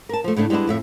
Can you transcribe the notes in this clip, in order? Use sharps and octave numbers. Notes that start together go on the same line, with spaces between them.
A#4 A5
F3 A3
A2 C#3 A3 D4
G3 G#3 B3 D4 E4
F2 A2 E5